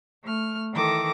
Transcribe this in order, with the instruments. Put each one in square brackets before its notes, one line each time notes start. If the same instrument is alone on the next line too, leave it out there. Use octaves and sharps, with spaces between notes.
[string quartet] A3 F6
D#3 E3 A4 D6 A#6